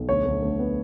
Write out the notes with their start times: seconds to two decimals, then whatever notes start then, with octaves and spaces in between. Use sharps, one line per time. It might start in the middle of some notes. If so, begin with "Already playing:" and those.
Already playing: B1
0.09 D2 C#5
0.25 D2
0.42 D2
0.59 B3